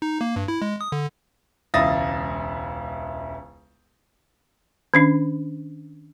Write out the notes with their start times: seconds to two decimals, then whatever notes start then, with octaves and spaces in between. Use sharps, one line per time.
0.02 D#4
0.21 A#3
0.36 G2
0.48 E4
0.62 G#3
0.81 D#6
0.92 D3
1.74 E1 C#2 E4 D#6 A6 A#6
4.94 D#3 C#4 D4